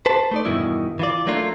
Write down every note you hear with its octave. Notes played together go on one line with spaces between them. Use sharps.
B4 C5 A5
A3 D#4 D5
E2 G2 B2 D#3 E4
E3 F4 D5
F#3 A3 A#3 D4 F4